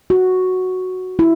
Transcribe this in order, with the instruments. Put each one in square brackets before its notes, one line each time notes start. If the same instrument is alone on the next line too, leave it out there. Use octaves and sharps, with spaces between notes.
[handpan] F#4
E4